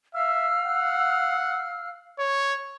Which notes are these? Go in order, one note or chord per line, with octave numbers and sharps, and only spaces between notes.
E5 F5 E6 F6
F#5
C#5